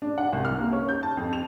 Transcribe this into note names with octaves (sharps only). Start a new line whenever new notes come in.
D4
F#5
C2
F6
A#3
C#4
G6
A5
F2
F7